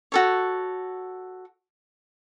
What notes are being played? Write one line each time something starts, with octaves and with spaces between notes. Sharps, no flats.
F#4 A4 C#5